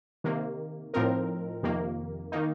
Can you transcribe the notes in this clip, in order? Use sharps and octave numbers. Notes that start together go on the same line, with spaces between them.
C3 D#3 A#3
A2 F3 C4 D#4 A#4
F2 C3 D#3 A#3
D#3 A#3 D#4